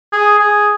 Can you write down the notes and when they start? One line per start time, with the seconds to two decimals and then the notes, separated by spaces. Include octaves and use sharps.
0.13 G#4
0.39 G#4